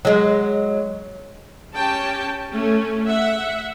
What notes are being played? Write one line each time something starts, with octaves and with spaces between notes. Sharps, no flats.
F#3 G#3
C#4 G4 C#5 G5 A5
A3 C#4
E5 F#5